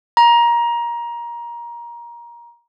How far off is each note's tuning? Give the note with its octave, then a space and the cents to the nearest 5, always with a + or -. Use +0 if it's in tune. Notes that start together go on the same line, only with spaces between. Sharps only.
A#5 +20